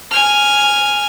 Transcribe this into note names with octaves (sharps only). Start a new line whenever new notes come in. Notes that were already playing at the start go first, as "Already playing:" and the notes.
G#5 F6